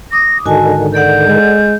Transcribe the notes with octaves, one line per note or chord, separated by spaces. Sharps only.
D6 D#6 A#6
G#2 D3 D#3 F#4 D#5 G#5 A5
A4 D5 F#5 G6
G#3